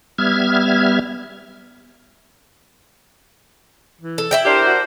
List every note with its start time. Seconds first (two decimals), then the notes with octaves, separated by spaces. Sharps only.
0.18 G3 B3 E5 F6 G#6
4.01 E3
4.18 A4
4.31 E4 E5 G5
4.45 D4 G4 A#4 C5
4.66 F#4